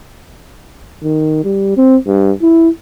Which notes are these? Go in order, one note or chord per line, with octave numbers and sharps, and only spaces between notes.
D#3
G3
C4
G2
E4